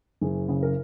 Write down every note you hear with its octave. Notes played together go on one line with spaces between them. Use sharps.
F#1 G#4
C#3
A#4